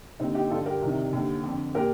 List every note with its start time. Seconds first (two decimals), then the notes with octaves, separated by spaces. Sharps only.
0.20 D#2 C4 D#4
0.23 D3
0.35 D#4 G4
0.50 G2 D3 F4 A4
0.66 G4 A#4
0.82 C2 C3 D#3
1.13 D#2 D3
1.44 F2 D3
1.75 A#2 G4 A#4